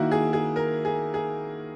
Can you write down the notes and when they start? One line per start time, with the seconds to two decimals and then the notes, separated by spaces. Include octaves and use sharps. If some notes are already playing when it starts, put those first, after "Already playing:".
Already playing: D#3 A#3 E4 F#4
0.11 G#4
0.33 G#4
0.56 A#4
0.85 G#4
1.14 G#4